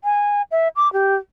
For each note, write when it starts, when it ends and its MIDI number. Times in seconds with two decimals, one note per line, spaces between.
0.04 0.42 80
0.51 0.68 76
0.76 0.91 86
0.93 1.16 67